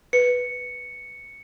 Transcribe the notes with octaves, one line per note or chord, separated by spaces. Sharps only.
B4 C#7